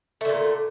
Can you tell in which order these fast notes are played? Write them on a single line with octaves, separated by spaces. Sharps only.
A3 D3 A#2